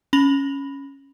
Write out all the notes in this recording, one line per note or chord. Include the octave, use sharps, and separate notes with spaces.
C#4 B5 A#6 F7 F#7